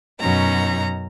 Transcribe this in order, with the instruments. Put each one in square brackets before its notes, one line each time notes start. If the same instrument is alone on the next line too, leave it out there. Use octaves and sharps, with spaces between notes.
[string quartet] F#2 B2 C#4 D#4 A#5